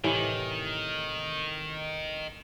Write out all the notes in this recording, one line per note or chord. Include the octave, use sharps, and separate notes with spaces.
A2 C3 D#3 E3